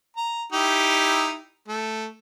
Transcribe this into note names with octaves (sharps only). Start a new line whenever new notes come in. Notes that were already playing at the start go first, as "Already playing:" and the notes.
A#5
D#4 E4 G4
A3